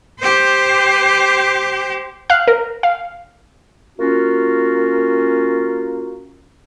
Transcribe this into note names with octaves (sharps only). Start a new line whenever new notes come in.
G4 C5
F5 F#6
A#4
F5
A#3 C#4 F4 F#4